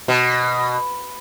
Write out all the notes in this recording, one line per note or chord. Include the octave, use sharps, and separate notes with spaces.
B2